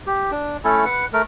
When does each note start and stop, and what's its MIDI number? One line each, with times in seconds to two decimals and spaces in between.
0.07 0.31 67
0.31 0.57 62
0.64 0.85 57
0.64 0.85 61
0.64 0.85 64
0.64 0.85 69
0.85 1.05 71
0.85 1.05 78
1.13 1.22 57
1.13 1.22 70